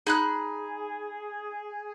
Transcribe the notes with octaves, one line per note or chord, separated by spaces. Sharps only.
D#4 G#4 B5 F#6